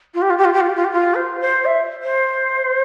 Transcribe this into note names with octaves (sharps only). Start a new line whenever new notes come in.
F4
G4
F4
G4
F4
G4
F4
G4
F4
G4
F4
C5
C5
E5
C5